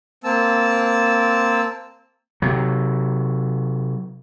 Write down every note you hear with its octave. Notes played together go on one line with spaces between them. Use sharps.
A#3 C4 A5 E6
C3 F#3